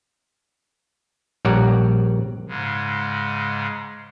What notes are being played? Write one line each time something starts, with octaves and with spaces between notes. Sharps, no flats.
A#1 G3 C#5 D5 F#5 A#5
G#2 C#3 G#3